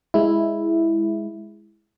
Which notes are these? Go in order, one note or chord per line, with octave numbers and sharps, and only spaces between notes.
G#3 E4